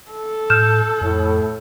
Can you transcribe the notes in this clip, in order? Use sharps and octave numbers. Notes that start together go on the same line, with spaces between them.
A4
A2 F6 G6 E7
F2 A2